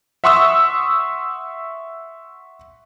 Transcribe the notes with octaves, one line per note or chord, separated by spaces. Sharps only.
E5 F#5 C6 C#6 D#6 E6